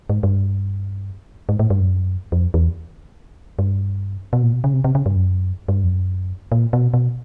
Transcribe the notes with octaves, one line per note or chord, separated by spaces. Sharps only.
G#2
G2
G#2
A2
G2
F#2
F2
E2
G2
B2
A#2
B2
C#3
C3
C3
C#3
G2
F#2
G2
F2
F#2
A#2
B2
B2